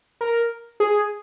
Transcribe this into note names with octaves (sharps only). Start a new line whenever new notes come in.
A#4
G#4